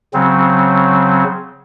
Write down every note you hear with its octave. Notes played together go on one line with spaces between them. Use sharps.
C#3 F#3 C4